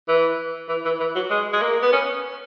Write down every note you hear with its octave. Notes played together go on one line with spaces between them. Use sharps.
E3
E3
E3
E3
F#3
G#3
G#3
A#3
B3
C#4